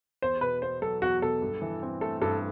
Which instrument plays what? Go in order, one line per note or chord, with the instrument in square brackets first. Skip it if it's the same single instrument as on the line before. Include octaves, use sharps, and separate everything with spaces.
[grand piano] E2 [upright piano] C5
[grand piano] B2 [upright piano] B4
[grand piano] B3 [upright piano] C5
[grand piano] F#3 [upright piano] A4
[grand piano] E2 [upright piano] F#4
[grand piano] B2 [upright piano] A4
[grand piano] G2
E3
C4
[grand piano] A3 [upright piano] A4
[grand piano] G2 [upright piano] A4